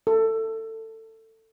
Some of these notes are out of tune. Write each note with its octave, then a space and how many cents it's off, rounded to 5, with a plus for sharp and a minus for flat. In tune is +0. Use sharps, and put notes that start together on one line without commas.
A4 +20